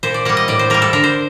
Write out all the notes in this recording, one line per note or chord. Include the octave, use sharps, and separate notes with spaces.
A#2 C5
D5
G3 A#3 F#5
D#5
A2 D5
C5
G3 A#3 A#4
A4
D3 A#4
C5